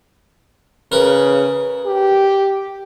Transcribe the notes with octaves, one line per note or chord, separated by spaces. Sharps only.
C#3 A#4 B4
G4